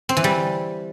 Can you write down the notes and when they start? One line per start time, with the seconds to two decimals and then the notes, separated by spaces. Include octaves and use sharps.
0.09 C4
0.17 E3
0.24 G3